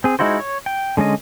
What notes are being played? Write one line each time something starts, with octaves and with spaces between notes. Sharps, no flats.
C4 G#4
G#3 D#4 E4 F#4 C5
C#5
G5
D3 G#3 C#4 D#5